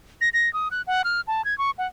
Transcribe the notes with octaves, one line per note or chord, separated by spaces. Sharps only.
A#6
A#6
D#6
F#6
F#5
F6
A5
G#6
C#6
F#5